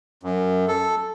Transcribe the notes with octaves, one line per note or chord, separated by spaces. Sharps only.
F#2
A4